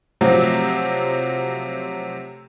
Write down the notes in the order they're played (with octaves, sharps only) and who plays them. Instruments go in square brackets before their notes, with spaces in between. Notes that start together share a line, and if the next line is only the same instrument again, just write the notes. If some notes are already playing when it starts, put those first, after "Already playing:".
[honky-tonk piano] C3 F3 F#3 A3 C4